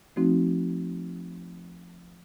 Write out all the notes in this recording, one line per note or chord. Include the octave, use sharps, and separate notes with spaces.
F3 A3 C4 D#4 F#4